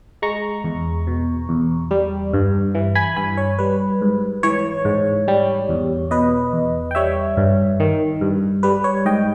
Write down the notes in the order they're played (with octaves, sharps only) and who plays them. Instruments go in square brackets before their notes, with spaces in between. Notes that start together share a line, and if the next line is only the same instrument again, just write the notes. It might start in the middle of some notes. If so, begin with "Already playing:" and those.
[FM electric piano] G#3 A#5 C#6
E2
B2
E2
G3
G2
E3
G#5 B5
G2 G#5 B5
C#5
G3 B4
G#2
E3 C#5
G#2
G3
E2
B2 B4 D#5
E2
G5
G3 C#5 E5
G2
D#3
G2
G3 B4
C#5
G#2 D#5 G5